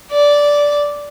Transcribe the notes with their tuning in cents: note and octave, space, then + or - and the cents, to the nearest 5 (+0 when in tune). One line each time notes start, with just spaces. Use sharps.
D5 -10